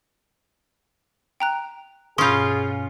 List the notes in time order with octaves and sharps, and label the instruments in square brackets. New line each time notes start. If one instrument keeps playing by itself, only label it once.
[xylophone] G5 A#5 F#6
[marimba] G2 B2 [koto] C#4 F4 [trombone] G#4 [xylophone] C6 G6